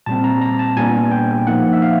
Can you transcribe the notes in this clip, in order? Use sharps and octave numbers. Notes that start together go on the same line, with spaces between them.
A#2 G3 C4 A5
A#5
A#5
A5
A#2 G3 B3 D4 G#5
G5
F3 A#3 D#4 F#5
E5
F5